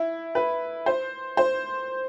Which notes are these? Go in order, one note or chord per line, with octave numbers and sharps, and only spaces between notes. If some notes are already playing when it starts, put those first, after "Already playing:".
Already playing: E4
B4
C5
C5